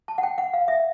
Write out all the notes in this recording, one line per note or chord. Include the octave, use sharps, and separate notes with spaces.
A5
F#5
G5
F#5
F5
E5